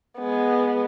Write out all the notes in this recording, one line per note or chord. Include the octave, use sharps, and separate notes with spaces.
G#3 B3